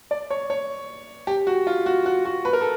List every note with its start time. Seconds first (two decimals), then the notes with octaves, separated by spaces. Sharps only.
0.11 D5
0.30 C#5
0.50 C#5
1.27 G4
1.47 F#4
1.67 F4
1.86 F#4
2.06 F#4
2.25 F#4
2.45 B4
2.53 A#4
2.61 A4